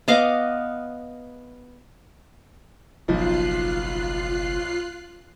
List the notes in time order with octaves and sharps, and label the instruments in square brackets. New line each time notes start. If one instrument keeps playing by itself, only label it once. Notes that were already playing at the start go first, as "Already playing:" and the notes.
[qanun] B3 D#5 F5 D6
[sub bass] F#1 [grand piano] B1 F3 D#4 [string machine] F4 F#6 C7